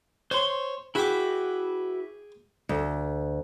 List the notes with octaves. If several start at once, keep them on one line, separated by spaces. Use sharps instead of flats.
C5 C#5 C6
E4 F#4 G#4 B4 G5 D6
D2